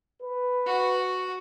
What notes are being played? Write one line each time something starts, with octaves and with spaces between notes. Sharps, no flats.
B4
F#4